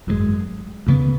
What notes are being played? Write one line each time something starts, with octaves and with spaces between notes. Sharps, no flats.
G#1 F#2 C#3 G#3
D2 C#3 G#3 B3